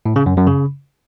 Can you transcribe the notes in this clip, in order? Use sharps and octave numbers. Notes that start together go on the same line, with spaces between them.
A2
C#3
F#2
F#2
C#3